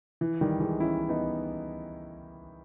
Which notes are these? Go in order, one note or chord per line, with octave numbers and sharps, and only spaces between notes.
E3
D#3 G3
E3 G#3
C#4 E4
B3 D#4